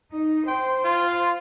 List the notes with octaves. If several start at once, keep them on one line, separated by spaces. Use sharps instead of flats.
D#4
C5 G5 C6
F4